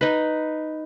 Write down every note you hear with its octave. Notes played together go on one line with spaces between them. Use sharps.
D#4 B4